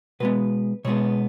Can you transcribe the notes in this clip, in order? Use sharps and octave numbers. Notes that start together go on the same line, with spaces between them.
B2 G#3 B3 B4
B2 G#3 B3 C#5